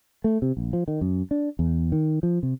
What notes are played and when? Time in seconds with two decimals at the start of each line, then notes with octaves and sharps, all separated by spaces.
0.24 A3
0.42 C3
0.57 A#1
0.73 F3
0.88 D#3
1.01 F#2
1.31 D4
1.59 E2
1.92 D#3
2.23 F3
2.43 C3